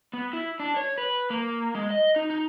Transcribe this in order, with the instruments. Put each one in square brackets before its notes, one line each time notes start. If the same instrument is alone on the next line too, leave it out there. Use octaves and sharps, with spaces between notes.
[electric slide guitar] B3
E4
D4
C#5
B4
A#3
G#3
D#5
D#4
D#4